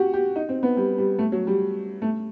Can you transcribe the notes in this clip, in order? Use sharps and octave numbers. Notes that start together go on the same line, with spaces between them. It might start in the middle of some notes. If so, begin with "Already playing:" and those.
Already playing: F#4 G4
G4
D#4
C4
B3
G3
G3
A3
F#3
G3
A3